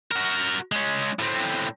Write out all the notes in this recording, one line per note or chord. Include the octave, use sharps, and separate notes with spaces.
F#4 A#4
G#3 C#4
A2 C4